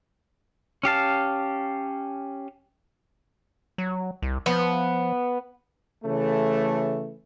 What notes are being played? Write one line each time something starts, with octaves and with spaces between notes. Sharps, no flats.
C#4 G4 F5 A5
F#3
C2
F3 B3
C#3 E3 A3